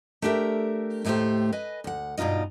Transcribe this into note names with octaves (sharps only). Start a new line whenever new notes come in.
A3 D4 G4 A#4 E5
D#2 A2 A3 C#4 G4 C5
B4 D#5 G#5
D2 F#5
G2 B2 D#4 F4 D#5